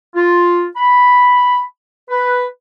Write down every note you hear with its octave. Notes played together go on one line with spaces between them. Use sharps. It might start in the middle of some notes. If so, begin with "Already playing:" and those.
F4
B5
B4